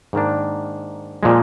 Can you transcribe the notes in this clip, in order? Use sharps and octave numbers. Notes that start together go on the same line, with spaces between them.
G#2 D#3 A#3 D4
A#2 F3 G#3